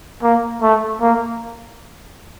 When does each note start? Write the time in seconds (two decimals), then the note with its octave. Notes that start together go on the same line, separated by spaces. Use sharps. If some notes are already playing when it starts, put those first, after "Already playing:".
0.23 A#3
0.62 A3
1.01 A#3